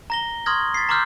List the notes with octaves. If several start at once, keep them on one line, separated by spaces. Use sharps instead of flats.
A#5 A#6 G7
C6 C#6 D#6 F6 G#6 A#6
A6 B6 C7
A#5 C6 D6 E6 F6 G6